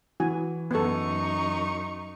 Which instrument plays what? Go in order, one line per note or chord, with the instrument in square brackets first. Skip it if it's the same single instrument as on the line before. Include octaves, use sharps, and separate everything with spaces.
[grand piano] E3 [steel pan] F#4 G#5
[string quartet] F#2 D#4 C#6 [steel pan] B3 A4